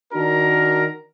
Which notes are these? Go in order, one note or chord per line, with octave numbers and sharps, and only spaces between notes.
D#3 D4 F#4 A#4 A#5